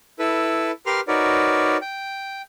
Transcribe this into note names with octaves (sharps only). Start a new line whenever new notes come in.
E4 A4 B4
G4 A#4 B4 C6 F6
D#4 F#4 A#4 B4 C#5 D5
G5